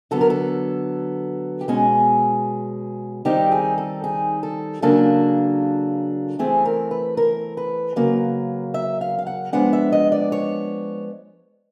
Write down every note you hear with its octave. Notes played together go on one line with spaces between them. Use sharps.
D3 F#3 B3 A4
A#4
A4
G4
B2 G#3 C#4 G#4
D#3 G3 C4 D#4 G4
G#4
A4
G#4
A4
C#3 F#3 A#3 D4 A4
E3 A3 C4 G#4
A#4
B4
A#4
B4
C#3 F#3 A#3
E5
F5
F5
F#5
F3 G#3 B3 D4 F#5
E5
D#5
D5
C#5